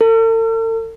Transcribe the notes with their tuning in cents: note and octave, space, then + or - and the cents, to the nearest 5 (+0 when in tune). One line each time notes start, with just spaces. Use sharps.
A4 +45